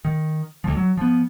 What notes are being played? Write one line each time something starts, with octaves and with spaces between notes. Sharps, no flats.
D#3
D2 F3
F#3
F3 B3